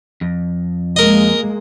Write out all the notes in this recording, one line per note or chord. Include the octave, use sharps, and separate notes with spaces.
F2
G#3 A#3 A#4 D#5